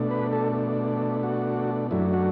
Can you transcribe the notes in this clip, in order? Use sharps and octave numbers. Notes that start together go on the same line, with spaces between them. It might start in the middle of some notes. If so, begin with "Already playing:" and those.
Already playing: B2 A3 D4
B4
A4
F#4
F#2 F#3 A3 D4 E4
F#4